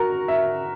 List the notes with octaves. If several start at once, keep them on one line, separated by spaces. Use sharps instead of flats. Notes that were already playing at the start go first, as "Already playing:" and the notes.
Already playing: F#4 A#4
E5